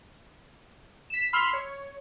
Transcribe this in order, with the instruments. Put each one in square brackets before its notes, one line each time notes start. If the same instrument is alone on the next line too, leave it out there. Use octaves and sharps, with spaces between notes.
[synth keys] B6 E7
B5 C6 E6 F6
C#5